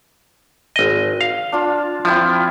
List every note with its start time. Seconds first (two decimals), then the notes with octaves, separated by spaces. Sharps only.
0.76 G#1 D#5
1.21 F5
1.52 D4 F4
2.05 F3 C4 E4 F4